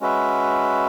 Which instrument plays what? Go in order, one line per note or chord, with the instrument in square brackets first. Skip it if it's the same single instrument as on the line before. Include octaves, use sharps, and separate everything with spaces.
[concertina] G#3 C#4 F#4 B4 E5